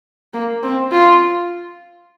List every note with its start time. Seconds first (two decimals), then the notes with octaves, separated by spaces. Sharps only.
0.34 A#3
0.63 C4
0.92 F4